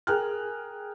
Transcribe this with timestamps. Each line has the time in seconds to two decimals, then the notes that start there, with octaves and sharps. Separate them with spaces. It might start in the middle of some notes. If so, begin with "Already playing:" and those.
0.07 G#4 A#4 G5 A#5 F6 F#6